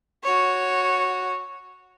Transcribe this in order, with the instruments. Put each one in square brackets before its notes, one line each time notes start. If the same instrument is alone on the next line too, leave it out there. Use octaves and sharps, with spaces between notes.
[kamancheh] F#4 C#5